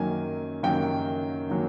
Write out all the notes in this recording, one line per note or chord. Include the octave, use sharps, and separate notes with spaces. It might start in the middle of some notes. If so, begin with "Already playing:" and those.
Already playing: F#2 D#3 F#3 A#3 C#4 G#5
F#2 D#3 F#3 A#3 C#4 G5
D#3 F#3 A#3 C#4